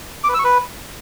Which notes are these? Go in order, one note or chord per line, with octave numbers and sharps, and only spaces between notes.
D6
B4
E6
C#6
B4